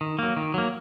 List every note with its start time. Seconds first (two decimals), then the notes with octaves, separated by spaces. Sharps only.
0.01 D#3
0.19 F#3 A#3
0.36 D#3
0.54 F#3 A#3